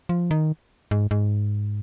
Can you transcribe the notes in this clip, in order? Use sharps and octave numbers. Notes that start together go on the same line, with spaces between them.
F3
D#3
G#2
G#2